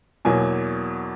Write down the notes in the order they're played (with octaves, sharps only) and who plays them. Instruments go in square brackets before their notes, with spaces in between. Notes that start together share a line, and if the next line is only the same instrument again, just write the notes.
[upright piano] E2 B2 F#3 A#3 G#5